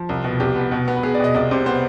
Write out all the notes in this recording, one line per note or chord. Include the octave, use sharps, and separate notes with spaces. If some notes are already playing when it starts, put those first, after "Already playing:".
Already playing: F3
C2
B2
C2 G4
B3
B2
B3
B4
B3 G#4
D5
B2 D#5
C2 D5
C3 C5
B3 C5